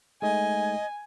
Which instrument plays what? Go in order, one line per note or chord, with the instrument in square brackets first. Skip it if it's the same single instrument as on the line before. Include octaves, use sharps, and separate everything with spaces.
[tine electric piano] G#3 A3 D#4 [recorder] D#5 [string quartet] G#5